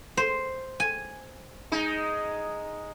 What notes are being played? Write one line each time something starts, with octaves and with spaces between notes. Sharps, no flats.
C5
G#5
G#3 D#4